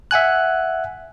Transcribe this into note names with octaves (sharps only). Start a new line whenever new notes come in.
E5 F#5 G#5 F#6